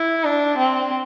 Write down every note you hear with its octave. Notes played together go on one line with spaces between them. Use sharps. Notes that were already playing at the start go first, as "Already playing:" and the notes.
Already playing: E4
D4
C4